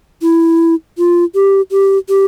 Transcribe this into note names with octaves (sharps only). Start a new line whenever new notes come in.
E4
F4
G4
G4
G4